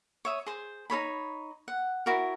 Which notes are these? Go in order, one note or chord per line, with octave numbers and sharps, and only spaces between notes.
C#5 E5 D#6
G#4 C5
D#4 A4 C#5 B5
F#5
E4 F#4 A#4